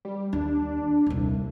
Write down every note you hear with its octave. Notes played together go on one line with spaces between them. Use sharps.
G3
D#2 D4
D#1 C2